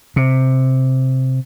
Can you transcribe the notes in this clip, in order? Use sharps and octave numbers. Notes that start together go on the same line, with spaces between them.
C3